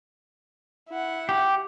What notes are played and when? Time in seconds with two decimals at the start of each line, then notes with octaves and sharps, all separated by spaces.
0.89 E4 F#5
1.29 G4